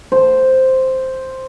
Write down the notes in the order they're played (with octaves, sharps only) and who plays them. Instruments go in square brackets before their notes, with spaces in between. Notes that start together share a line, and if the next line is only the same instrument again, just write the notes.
[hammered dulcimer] C5